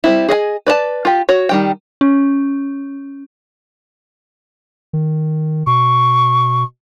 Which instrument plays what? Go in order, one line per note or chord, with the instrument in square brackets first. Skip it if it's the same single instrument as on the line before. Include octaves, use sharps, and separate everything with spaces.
[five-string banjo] G3 C4 E4
G#4 D#5 E5 G#5
B4 D5 D#5 A5
F4 G4
F#4 C#5
D#3 G3 G5
[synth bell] C#4
[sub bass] D#3
[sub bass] B2 [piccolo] C#6